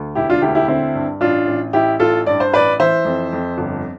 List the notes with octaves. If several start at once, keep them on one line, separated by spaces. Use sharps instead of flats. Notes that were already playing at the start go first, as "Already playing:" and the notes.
Already playing: D2
E1 E4 G4
D4 F4
D2 E4 G4
E4 G4
D3 C4 E4
G2
A1 D4 F4
A1
A1 E4 G4
A1 F4 A4
G2 D5
C5
A1 B4 D5
E3 C5 E5
F2
F2
G1